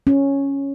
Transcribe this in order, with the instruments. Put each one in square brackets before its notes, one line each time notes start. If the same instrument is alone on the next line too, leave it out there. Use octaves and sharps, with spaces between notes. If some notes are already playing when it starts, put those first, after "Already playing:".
[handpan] C#4